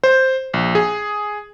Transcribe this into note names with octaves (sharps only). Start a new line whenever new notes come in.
C5
A#1
G#4